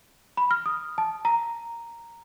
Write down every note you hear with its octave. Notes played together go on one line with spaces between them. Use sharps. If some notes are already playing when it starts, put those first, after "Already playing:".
B5
F6
D#6
A5
A#5